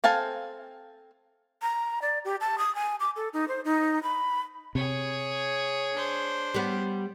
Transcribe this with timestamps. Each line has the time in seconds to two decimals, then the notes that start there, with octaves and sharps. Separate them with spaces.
0.04 C4 A4 F5 G#5 A5
1.61 A#5
2.02 D5
2.25 G4
2.41 A5
2.58 D#6
2.75 G#5
3.00 D6
3.16 A4
3.33 D#4
3.48 C5
3.65 D#4
4.03 B5
4.75 C3 G#4 C#5
5.92 D4 C5
6.54 G3 B3